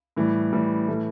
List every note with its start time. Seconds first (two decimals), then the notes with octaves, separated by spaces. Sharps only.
0.17 A2 E3 G3
0.53 A2 E3 G3
0.88 A2 E3 A3